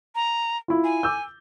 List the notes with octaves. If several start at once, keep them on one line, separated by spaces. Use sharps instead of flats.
A#5
E4 F4
G#5
D6 E6 G6